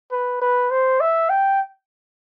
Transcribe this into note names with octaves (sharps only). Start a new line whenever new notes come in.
B4
B4
C5
E5
G5